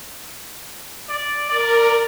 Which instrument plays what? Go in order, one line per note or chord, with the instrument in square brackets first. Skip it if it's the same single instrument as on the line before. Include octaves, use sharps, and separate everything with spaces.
[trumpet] D5
[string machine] A#4 [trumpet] D5